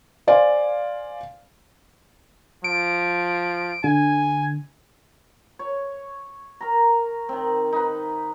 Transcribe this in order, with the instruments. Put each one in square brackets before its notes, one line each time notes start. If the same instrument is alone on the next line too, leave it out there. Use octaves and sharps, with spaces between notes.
[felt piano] C5 D5 F5 G#5 C6
[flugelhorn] F3 [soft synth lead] D7
[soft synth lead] D3 [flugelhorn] G#5
[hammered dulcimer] C#5
A#4 A#5
D#3 C4
D#4 B4